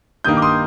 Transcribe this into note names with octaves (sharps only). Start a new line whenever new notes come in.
G2 D#3 A#3 D#6 G6
D6
C6 D#6